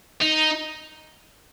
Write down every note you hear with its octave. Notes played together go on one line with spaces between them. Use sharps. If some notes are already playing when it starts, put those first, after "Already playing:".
D#4